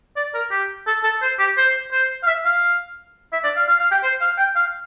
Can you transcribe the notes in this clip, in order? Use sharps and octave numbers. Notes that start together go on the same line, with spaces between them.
D5
A#4
G4
A4
A4
C5
G4
C5
C5
F5
E5
F5
E5
D5
F5
F5
F5
G5
C5
F5
G5
F5